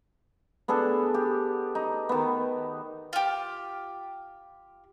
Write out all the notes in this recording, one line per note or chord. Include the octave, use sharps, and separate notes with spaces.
B3 D4 G#4 A4
G4
D#4
D#3 B3
F4 G4